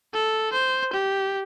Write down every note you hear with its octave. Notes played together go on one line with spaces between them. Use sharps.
A4
C5
G4